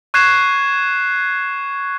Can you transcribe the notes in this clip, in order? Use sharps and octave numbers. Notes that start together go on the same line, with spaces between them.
C#6 F#6 G#6 C7 E7